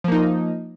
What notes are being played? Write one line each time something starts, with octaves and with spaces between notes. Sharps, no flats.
F3 A#3 D#4